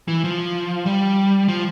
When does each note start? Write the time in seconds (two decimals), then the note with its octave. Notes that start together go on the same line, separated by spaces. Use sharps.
0.08 E3
0.24 F3
0.86 G3
1.48 F3